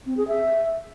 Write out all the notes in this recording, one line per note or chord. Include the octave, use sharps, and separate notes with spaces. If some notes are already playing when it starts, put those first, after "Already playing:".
C4
G#4
E5